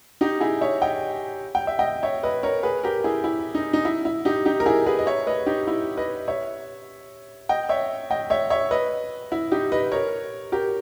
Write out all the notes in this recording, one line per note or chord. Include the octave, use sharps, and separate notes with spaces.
D#4 G4
E4 G#4
C#5 E5
D#5 G5
G5
E5
D#5 G5
C#5 E5
B4 D#5
A#4 C#5
G#4 B4
G4 A#4
E4 G#4
E4
D#4
D#4
E4
E4
D#4 G4
D#4 G4
A#4
E4 G#4
G#4 B4
D#5
C#5 E5
B4 D#5
D#4 G4
E4
B4 D#5
C#5 E5
D#5 G5
C#5 E5
D#5 G5
C#5 E5
C#5 E5
B4 D#5
E4
D#4 G4
B4 D#5
A#4 C#5
G4 A#4